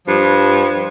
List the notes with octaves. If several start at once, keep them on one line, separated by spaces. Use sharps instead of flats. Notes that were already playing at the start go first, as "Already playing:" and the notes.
G2 F3